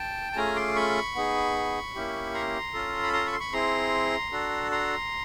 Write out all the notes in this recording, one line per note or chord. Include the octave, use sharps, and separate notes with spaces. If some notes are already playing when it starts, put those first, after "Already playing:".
Already playing: G5 A5
A5
A3 C#4 F4 G#4 G#5 A#5
C6 D6
B5 C#6
B3 D#4 G#4
A#3 C#4 E4 G4
A#5 C6
C#4 F4 A4
B5
A#5 C6
B5 C#6
C6
B5 C#6
C4 E4 G#4 A#5 C6
D4 F#4 A4
A#5 C6